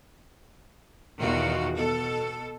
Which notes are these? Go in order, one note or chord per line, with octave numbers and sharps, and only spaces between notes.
E2 B2 D#3 F4 F#4
B2 A4